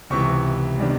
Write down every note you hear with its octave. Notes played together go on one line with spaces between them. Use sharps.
C#2 C3 E3 C#6
C3 D#3 G3 B3 D4